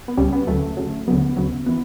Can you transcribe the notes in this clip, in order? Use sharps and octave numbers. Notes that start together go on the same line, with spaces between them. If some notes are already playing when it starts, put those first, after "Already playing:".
B3
C#2 C#3 G3 C#4
B3
D2 C#3 F#3 A3
D2 C#3 F#3
D2 C#3 F#3 B3
D2 C#3 F#3
E3 B3